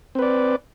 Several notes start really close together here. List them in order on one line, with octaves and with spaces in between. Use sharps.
C4 B4 D5